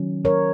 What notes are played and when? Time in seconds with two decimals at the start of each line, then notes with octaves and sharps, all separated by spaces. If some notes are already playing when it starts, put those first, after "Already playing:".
Already playing: D#3 F#3 C#4
0.25 A#4 C#5